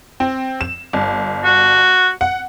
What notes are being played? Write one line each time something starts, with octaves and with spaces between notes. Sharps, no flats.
C4
E7
G1
F#4
F#5